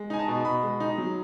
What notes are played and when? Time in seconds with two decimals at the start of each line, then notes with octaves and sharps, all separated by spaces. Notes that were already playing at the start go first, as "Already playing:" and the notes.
Already playing: G#3
0.10 D#4 G#5
0.19 A5
0.28 B2
0.45 B2 B5
0.63 G#3
0.80 D#4
0.98 F#3